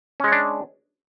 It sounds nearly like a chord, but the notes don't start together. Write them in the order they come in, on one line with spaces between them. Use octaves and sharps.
C#4 G#3 C#5 D4